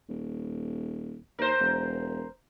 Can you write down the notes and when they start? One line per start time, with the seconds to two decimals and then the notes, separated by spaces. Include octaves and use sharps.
0.09 D#1
1.39 D#2 A#4 C5
1.60 E1